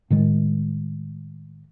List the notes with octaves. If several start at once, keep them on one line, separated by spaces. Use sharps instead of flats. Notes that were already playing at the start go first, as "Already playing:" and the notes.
A2 D#3 G#3